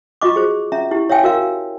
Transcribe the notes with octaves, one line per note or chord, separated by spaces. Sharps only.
F4 F#4 D#5 C#6 D6
G#4 C5
C#4 E5 A#5
E4 G4
C#5 E5 F5 G5 G#5
F#4 A#4 F5